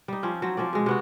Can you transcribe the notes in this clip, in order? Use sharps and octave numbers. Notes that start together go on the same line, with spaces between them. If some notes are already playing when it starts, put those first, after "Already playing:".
G3 D#4
F3 C4 C#4
F#3 C4
F3 C4 C#4 D5
B2 G#3
C3 B3 F#4